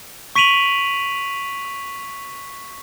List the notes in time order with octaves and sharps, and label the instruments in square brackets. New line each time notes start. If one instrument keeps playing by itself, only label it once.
[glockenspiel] C#6 B6 D7 D#7 F7 F#7